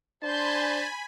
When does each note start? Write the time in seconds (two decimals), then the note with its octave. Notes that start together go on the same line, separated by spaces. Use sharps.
0.23 D4 C5 G#5 A5 B5 C6 G6